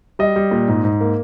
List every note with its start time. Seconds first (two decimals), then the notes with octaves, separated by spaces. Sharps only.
0.19 G3 D#5
0.36 G3
0.51 A#2
0.68 G#2
0.84 G#2
1.01 A#3